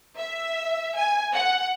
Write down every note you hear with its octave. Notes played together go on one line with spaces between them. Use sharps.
E5
G#5
F#5